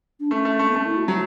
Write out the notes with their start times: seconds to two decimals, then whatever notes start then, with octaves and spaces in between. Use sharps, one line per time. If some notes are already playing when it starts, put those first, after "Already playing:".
0.20 D4
0.31 A3 C#4
0.45 A3
0.59 A3
0.69 B3
0.75 A3 C#4
0.85 E4
0.97 F#4
1.07 F#3 F#4